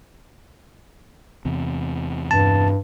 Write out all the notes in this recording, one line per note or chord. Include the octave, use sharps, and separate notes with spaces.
E2 C3
G2 A5